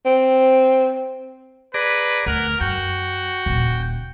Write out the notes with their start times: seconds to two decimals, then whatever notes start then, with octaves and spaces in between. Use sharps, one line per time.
0.05 C4
1.74 G#4 B4 D5 A#5
2.26 D2 A#4 F#5
2.61 F#2 F#4 G5
3.46 D#1 C#3